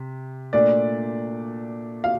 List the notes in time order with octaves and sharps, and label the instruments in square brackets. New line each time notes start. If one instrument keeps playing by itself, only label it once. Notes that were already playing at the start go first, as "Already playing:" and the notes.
Already playing: [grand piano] C3
[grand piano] A#2 A3 D4 [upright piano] D5
[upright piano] F5